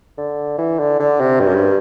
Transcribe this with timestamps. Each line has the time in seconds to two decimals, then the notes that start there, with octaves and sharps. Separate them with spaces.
0.18 D3
0.58 E3
0.80 D3
1.00 D3
1.20 C3
1.40 G2
1.48 F#2
1.55 G2